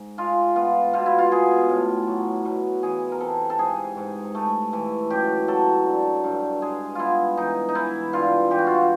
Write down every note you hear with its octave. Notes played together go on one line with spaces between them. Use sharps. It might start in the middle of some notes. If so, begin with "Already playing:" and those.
Already playing: G#2
G#3 F4
B3 F4
B2 F4
E4
F4
B3 G#4
A2
F#3
B2
E3 G#4
A#4
C3 A4
A4
G#2 G#4
G#2
A3
E3
F#2 G4
F#3 A4
D3
G2
G#3 G#4
B3 E4 F4
E3 D#4
D#4
E3 E4
G2 F4
E3 G4
F#4
F4
F#4